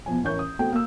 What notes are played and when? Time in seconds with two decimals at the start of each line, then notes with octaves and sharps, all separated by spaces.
0.06 E2 B2 F3 G#5
0.24 A1 E3 C#4 A#4 C#6 G6
0.39 D#6
0.59 A3 B3 C4 F#4 G5
0.72 A#3 E6